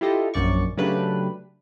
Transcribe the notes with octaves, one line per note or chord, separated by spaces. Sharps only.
E4 F4 G4 A4 D#5
A#1 F#2 D5 C#6
C#3 F#3 A3 D4 G4 B4